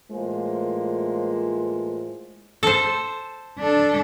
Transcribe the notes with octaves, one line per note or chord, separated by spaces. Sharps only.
A2 E3 G#3 A#3 F4 C5
A4 C5
D4 A4